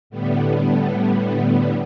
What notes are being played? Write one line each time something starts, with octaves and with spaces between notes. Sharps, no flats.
A2 D3 G3 B3